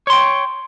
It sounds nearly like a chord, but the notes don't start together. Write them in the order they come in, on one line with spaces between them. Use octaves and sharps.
C#5 C6 G5